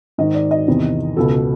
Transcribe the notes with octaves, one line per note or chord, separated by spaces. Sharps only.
G#2 D#3 D#5
D5
D#5
E2 C3 D#3
C#2 B2 A4